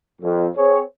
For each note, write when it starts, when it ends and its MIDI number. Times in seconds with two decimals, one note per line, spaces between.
0.22 0.47 41
0.56 0.81 60
0.56 0.81 68
0.56 0.81 73